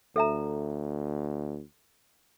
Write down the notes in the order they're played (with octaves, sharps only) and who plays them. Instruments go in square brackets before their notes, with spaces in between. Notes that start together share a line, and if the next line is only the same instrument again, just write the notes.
[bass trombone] D2 [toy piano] A4 E5 A#5